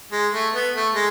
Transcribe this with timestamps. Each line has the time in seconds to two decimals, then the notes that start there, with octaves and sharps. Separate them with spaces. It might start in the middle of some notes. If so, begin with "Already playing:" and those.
0.12 G#3
0.33 A3
0.54 B3
0.74 A3
0.94 G#3